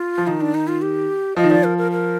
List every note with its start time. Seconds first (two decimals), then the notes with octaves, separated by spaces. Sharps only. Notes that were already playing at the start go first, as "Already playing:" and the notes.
Already playing: F4
0.18 F3
0.27 D#3 D#4
0.41 D4
0.54 D#4
0.68 F4
0.82 G4
1.36 F3 D#5
1.44 D#3
1.50 F3 D5
1.64 A#4
1.78 A#4
1.92 A#4